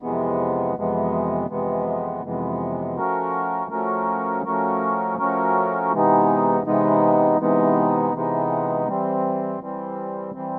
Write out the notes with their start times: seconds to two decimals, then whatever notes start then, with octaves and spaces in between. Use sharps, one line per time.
0.02 F2 C3 E3 G#3 B3
0.76 F2 C3 E3 G#3 B3
1.49 F2 C3 E3 G#3 B3
2.24 F2 C3 E3 G#3 B3
2.97 F3 A3 C#4 F#4 A#4
3.71 F3 A3 C#4 F#4 A#4
4.45 F3 A3 C#4 F#4 A#4
5.18 F3 A3 C#4 F#4 A#4
5.93 C3 E3 G#3 B3 D#4
6.66 C3 E3 G#3 B3 D#4
7.39 C3 E3 G#3 B3 D#4
8.14 C3 E3 G#3 B3 D#4
8.88 E3 G3 C4
9.62 E3 G3 C4
10.35 E3 G3 C4